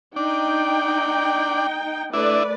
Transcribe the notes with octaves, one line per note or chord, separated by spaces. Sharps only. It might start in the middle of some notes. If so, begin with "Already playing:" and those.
D4 D#4 G5
A3 D4 E4 B4 D5